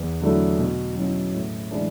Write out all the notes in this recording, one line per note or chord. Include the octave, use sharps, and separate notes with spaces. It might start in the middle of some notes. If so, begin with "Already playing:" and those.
Already playing: E2
D3 F#3 A3 E4
B2
F#3 C#4 E4
A2
E3 G#3 D4